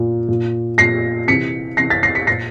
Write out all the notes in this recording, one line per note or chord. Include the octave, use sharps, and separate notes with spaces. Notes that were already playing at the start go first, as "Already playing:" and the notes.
Already playing: A#2
A#2
A#2 A#6 C7
C3 E3 B6 C#7
C3 E3 A#6 C7
A6 B6
A#6 C7
B6 C#7
A#2 A#6 C7